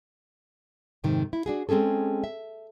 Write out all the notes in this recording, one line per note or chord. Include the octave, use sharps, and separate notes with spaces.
F2 G#2 C3 D#3
E4
D4 F#4 G#4
G#3 C4 C#4 G#4 A4
E5